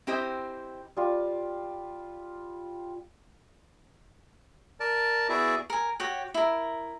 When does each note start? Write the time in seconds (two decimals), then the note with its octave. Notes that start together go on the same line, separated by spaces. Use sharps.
0.07 C4 E4 G4 C5 D#5
0.97 G3 F4
4.80 A#4 D5 A5
5.29 B3 E4 F#4 G#4 D5 E5
5.70 A#4 G#5
6.00 F#4 G4 C#5 G5
6.34 E4 A#4